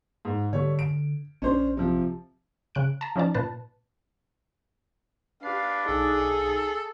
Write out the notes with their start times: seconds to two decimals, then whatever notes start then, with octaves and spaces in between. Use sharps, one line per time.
0.25 G#2
0.53 D3 G3 A3 C#5
0.79 D7
1.42 A#1 C#4 D4 C5
1.77 C3 F3
2.75 C#3 F#6 D7
3.01 A5 A#5
3.16 F3 C#4 D#4 D5 A5
3.34 A#2 B4 A5
5.43 D4 G4 B4 F5 C7
5.86 B1 D#4 G#4 A4